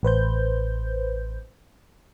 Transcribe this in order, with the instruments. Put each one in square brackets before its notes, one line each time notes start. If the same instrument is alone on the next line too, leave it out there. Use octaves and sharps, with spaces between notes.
[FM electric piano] A1 B4 C5 G6